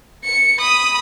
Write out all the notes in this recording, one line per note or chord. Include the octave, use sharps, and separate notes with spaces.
C#7
B5 D#6